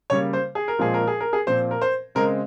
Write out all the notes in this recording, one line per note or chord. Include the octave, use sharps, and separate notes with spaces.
C#3 G3 A#3 C#5
C5
G#4
A#4
A#2 F3 G#3 C4 G#4
A#4
G#4
A#4
G#4
A#2 F3 C4 C5
A#4
C5
C#3 G#3 C4 A#4